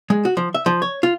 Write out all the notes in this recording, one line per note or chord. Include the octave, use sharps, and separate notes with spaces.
G#3
F#4
F3
E5
F3
C#5
F4